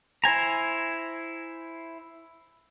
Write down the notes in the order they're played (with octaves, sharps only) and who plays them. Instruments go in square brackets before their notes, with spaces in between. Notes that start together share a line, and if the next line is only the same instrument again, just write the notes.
[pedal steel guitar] E4 C5 G#5 A#5